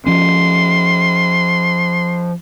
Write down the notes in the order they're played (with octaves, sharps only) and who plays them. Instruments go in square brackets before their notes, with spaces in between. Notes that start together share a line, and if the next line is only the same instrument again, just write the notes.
[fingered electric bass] F3 C#4 [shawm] C6